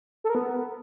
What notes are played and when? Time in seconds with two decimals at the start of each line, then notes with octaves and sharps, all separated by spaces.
0.24 A4
0.30 A#4
0.35 B3